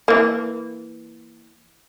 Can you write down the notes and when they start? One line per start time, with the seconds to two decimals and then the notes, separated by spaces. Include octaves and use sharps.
0.08 E3 A#3